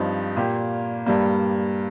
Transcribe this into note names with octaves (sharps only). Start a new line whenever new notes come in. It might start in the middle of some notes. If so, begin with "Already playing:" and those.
Already playing: G2 F3 C4 D#4
A#2 A#3 G4
G2 G3 A#3